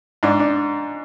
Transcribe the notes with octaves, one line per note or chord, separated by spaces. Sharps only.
G#2 D4
D4